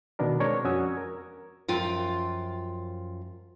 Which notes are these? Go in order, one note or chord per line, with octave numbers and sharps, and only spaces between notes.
B2 D#3 B3 D4 A#4
G#3 C4 D4 A#4 C#5
F2 C#4 F#4 D#6 E6 G#6
A#4
F#2 F3 F4 G5